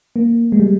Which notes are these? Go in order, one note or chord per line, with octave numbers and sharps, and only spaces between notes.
A#3
G#3
G3